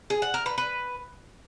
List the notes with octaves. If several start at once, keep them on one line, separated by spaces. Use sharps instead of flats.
G#4
F#5
A#4
B4
B4